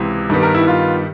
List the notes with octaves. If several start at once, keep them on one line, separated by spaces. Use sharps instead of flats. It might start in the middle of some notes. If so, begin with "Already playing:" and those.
Already playing: C#2 C3 E3
G2 D#3 G3 B3
A#4
E4
F4